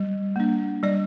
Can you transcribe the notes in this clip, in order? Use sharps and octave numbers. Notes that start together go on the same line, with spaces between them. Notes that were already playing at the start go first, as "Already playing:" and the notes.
Already playing: G3
A#3 D4
G3 D5